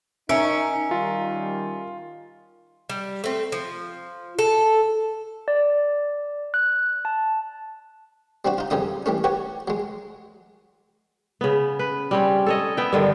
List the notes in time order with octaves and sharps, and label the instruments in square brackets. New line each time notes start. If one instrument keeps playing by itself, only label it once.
[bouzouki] C#4 A#4 [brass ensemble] D#4 [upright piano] E5
[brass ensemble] D#3 G3 [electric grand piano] F4
[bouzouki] G3
A3 C4
F3
A4
[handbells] D5
F#6
A5
[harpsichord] G3 C4 D4 F#4
D#4 F4
F2 C#3 G3 D#4 D#6
E3 G3 A3 C#4
F#4 G4 B4 C#5
F#3 G#3
[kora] C#3 B3
B4
G3 C4 C#4
A4 C#5 D#5
B3 E5 G5
G2 D3 D#3